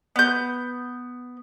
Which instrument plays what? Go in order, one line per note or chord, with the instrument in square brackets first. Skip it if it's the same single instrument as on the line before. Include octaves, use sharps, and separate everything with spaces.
[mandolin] B3 G6